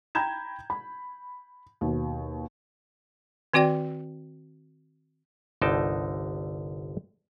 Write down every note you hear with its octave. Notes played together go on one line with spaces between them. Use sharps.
G5 A#5 B5 G6 G#6 E7
B5
D#2 B2
D#3 C4 F#4 D5 G5
G1 C2 D3 D#4 G5 A5